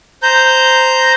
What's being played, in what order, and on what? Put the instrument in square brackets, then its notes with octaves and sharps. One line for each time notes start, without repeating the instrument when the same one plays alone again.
[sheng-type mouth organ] C5 A#5 G6